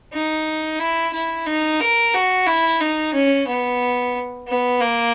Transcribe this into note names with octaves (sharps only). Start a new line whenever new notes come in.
D#4
E4
E4
D#4
A#4
F#4
E4
D#4
C#4
B3
B3
A#3